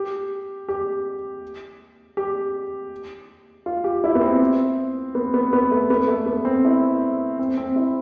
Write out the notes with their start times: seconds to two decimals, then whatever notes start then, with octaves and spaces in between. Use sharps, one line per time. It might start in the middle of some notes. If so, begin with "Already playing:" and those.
Already playing: G4
0.69 G4
2.17 G4
3.66 F4
3.84 G4
4.04 E4
4.15 B3
4.22 C4
5.15 B3
5.34 B3
5.53 B3
5.71 A3
5.90 B3
6.08 A3
6.26 B3
6.45 C4
6.65 E4
7.39 C4
7.57 C4
7.76 E4